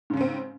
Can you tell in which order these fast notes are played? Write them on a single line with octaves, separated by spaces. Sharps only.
G#2 C#3 C#4 C4